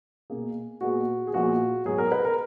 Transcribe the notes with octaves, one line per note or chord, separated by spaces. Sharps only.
B2 A#3 G#4
A#2 G#3 B3 F#4
G#4
A#2 F3 G#3 B3 F#4
G#2 F#3 B3 G#4
A#4
B4
A#4